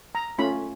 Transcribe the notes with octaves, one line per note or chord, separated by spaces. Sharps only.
A#5
A3 C#4 F4 B5